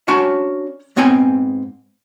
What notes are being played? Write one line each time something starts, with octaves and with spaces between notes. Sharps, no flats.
C#4 D4 F#4 A5 C6
G#2 B3 C4 G5 G#5